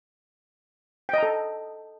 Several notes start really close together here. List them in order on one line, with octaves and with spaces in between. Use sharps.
G5 D#5 A#5 A4